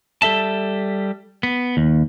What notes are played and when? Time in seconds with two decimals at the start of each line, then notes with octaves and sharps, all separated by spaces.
0.22 G3 A4 E5 A5
1.43 B3
1.77 D#2